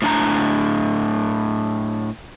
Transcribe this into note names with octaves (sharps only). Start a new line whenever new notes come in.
A2 D4 A#5